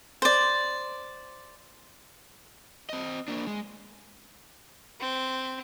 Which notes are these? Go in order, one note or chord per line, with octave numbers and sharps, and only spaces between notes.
C5 D5
C4 D#5
A#3 D4
G#3
C4